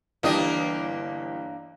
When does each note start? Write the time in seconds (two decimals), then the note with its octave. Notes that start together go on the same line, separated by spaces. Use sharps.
0.23 G1 E3 A#3 D4 G4 D#5